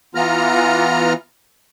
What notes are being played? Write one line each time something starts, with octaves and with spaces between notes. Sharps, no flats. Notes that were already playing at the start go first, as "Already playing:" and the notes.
E3 B3 F4 A#5 F6